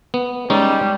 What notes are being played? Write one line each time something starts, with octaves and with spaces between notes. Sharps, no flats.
B3
G3 G#3 C#4 D#4